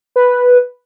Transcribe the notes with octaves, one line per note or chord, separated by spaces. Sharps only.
B4